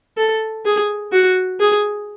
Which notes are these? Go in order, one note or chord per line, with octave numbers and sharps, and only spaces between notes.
A4
G#4
F#4
G#4